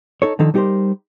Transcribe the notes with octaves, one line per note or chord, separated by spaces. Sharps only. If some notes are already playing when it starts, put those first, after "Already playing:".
D#4 A4 C#5
D3 D#3 F3 D#4 A4
G3 D#4 G4 G#4 A#4 C5